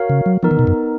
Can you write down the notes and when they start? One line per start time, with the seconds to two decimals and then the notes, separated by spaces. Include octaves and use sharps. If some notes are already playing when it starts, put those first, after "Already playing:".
Already playing: F#4 A#4 C#5 F5
0.09 C#3
0.26 F#3
0.43 F3 B3 D#4 A#4
0.51 D#3
0.59 B2
0.67 F#2